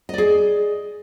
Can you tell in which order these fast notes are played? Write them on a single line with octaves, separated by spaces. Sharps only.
D#5 D5 G#4